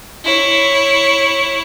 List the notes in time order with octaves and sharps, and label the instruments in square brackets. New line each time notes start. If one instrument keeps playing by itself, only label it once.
[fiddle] E4 C#5